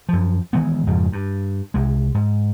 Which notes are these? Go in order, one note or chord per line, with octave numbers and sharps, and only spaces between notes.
F#2 F3
D#3 E3 G#3 B3
F2 G#2 C#3 F3
G2
C2 G#3
G#2